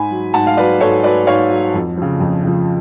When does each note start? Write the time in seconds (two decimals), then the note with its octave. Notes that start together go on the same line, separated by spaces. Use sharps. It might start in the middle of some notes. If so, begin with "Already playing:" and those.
Already playing: G#2 G#5 B5
0.11 F#3
0.33 G#2 F#5 A5
0.47 F5
0.57 F#3 B4 D5
0.80 G#2 A4 C#5
1.04 F#3 B4 D5
1.27 G#2 C#5 F5
1.50 F#3
1.74 F2
1.97 C#3 F3
2.20 F2
2.44 C#3 F3